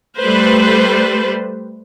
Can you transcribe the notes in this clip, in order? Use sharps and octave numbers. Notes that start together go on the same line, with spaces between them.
G3 A3 B4 C5